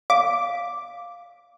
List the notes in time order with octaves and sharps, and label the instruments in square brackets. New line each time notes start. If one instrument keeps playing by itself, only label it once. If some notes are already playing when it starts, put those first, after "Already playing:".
[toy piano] F5 [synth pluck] D6